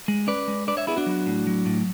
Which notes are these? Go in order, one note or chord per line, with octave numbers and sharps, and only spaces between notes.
G#3
C#4 B4 D5
G#3
D4 B4 D5
C#5 E5
B3 E4 G#4
D4 F#4
F#3
A2
F#3
A2